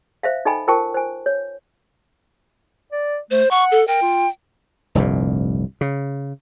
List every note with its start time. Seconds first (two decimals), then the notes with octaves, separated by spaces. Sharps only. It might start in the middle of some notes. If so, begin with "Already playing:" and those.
0.23 C5 E5 F5
0.45 D#4 A4 D#5 G5 G#5 B5
0.68 F4 A#4 C5 G5 A5 C#6
0.94 C5 G#5
1.26 C#5
2.92 D5
3.31 A3 C5
3.51 F#5 C#6
3.71 A4
3.88 A#4 G5
4.02 F4
4.95 F1 C2 G2 A#2
5.81 C#3